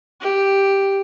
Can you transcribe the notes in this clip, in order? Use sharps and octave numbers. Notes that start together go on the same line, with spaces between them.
G4